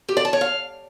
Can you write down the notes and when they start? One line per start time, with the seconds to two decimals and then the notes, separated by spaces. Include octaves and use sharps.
0.09 G4
0.17 D5
0.25 A5
0.33 C#5
0.41 F5